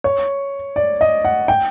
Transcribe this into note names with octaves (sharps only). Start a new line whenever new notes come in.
C#5
D5
D#5
F#5
G5